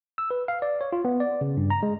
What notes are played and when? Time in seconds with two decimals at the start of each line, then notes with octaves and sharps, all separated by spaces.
0.18 E6
0.31 B4
0.48 F5
0.62 D5
0.81 C#5
0.93 F4
1.05 B3
1.20 D5
1.41 C#3
1.57 G2
1.70 A#5
1.83 G#3